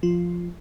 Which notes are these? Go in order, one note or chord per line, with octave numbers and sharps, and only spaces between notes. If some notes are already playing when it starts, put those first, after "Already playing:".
F3 F4